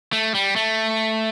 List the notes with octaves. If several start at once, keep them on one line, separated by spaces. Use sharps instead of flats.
A3
G3
A3